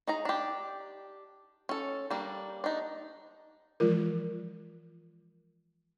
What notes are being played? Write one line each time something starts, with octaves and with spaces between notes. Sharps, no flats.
D#4 G#4 A#5
D4 G4
C#4 A4
G3 A#3 D4
D4 D#4
E3 F3 G#3 F4 A#4